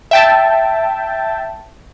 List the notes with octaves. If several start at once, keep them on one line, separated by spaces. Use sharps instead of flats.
E5 G5 A5